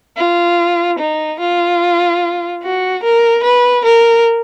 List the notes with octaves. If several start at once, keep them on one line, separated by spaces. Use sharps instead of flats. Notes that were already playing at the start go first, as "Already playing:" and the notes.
F4
D#4
F4
F#4
A#4
B4
A#4